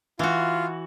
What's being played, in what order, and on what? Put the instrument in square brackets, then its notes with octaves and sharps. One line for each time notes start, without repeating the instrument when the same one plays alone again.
[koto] E3 F#4 [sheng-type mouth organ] F4